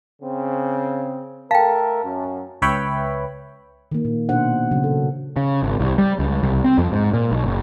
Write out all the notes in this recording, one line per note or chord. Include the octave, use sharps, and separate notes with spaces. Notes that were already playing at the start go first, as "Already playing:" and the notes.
C#3 C4
A3 A4 A#4 F5 G5 A5
F#2
C#2 B4 C#5 E5 G5 B5
D#3 A#3
A#2
B2 D4 F#4 C5 F#5
C#3 F#3
A4
C#3
G#1
C2
G3
C#2
C2
C4
F2
G#2
A#2
B1
F#1